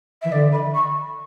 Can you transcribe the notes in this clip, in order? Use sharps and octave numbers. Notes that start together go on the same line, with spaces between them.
E5
E3
D3 D5
B5
C#6